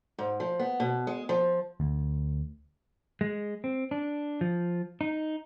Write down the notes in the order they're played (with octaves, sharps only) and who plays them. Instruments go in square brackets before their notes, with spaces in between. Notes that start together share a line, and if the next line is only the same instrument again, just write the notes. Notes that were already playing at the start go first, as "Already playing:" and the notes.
[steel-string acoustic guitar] G#2
F3
B3
B2
G#3
F3
[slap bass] D2
[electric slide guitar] G#3
C4
D4
F3
D#4